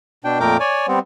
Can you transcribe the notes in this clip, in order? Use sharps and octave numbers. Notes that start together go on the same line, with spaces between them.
B2 D4 G5
F2 A#2 A3 A#4 G5 D6
C#5 D5 G#5
G3 B3 C4